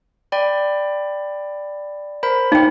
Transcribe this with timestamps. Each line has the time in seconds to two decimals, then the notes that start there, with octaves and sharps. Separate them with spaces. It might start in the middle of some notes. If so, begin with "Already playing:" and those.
0.32 D5 G5 B5
2.23 A#4 C5 B5
2.52 D#4 G5